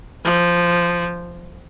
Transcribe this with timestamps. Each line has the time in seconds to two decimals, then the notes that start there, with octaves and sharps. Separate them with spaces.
0.24 F3